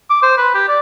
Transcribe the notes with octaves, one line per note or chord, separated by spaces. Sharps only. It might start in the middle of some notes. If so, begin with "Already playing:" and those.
D6
C5
B4
G4
D5